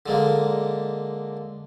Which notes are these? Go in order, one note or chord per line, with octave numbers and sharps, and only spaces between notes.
D3 G#3 A#3